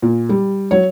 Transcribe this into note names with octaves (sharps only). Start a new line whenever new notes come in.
A#2
G3
F#3 C#5